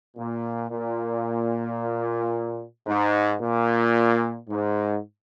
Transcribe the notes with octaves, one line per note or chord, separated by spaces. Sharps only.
A#2
A#2
G#2
A#2
G#2